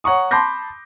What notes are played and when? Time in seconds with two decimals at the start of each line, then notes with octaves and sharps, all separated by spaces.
0.04 C#5 F#5 A#5 C#6 D#6
0.31 A5 B5 C6 D6 G6 A#6